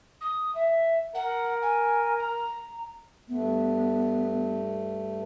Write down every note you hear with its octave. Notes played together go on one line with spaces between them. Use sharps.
D#6
E5
A#4 F#5
G#5
A#5
G2 A3 B3